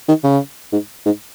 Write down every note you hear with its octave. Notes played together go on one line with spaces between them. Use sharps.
D#3
C#3
G#2
G#2